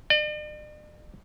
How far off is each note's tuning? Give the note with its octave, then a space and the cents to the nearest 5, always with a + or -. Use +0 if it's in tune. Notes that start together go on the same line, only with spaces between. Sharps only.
D5 +45